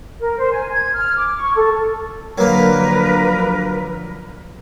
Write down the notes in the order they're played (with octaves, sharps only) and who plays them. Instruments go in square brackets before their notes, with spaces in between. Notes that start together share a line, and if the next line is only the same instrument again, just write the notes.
[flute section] A#4
C5
G#5
G#6
F6
D6
C#6
A4
[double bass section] D3 F3 [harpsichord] F#3 A#3 [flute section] A#4 B4